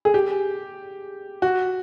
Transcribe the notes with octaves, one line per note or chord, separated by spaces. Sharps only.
G#4
G4
F#4